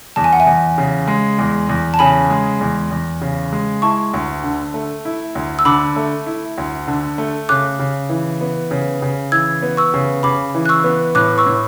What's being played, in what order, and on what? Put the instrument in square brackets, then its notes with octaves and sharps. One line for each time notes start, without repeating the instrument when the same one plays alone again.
[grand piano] E2 [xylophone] A5
[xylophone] G#5
F#5
E5 G#5
[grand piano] E2
C#3
G#3
E2
E2
[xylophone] A5
[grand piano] C#3 [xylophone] G#5 B5
[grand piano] G#3
E2
E2
C#3
G#3
[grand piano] E4 [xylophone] A5 C#6
[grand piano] D2
D3
A3
E4
D2
[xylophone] E6
[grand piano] D3 [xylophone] B5 D6
[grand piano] A3
E4
D2
D3
A3
[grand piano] C#3 [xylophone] D6 F#6
[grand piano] C#3
E3
B3
C#3
C#3
[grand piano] E3 [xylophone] E6 G#6
[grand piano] B3
[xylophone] C#6 E6
[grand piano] C#3
[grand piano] C#3 [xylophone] B5 D6
[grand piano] E3
[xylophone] F#6
C#6 E6
[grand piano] B3
[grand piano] A2 [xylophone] D6 F#6
[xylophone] C#6 E6
[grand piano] A2